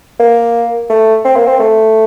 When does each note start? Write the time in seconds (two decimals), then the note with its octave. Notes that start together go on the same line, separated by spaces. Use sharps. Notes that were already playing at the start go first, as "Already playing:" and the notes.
0.20 A#3
0.90 A3
1.25 C4
1.36 A#3
1.47 C4
1.60 A3